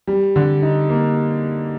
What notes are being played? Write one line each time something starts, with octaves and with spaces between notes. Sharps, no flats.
G3
D3
D#4
A#3